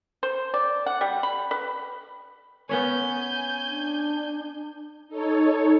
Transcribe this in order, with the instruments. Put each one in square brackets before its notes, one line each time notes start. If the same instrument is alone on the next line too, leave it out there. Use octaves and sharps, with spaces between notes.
[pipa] C5
D5
F#5
G3
B5
B4
[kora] B3 C#4 C#5 [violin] G#5 G6
[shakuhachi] D4
[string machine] D#4 A4 C#5